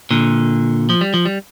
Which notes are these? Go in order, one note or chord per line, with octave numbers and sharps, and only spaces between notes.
A#2 D3
F3
G3
F3
G3